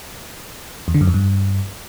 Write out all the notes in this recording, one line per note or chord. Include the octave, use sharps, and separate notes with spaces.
E2
D3
F#2
F2
G2